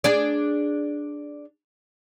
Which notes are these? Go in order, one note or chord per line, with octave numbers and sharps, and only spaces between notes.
D4 G#4 D5